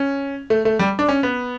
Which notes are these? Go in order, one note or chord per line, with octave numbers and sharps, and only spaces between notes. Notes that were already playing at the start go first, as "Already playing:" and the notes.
Already playing: C#4
A3
A3
G3
D4
C#4
B3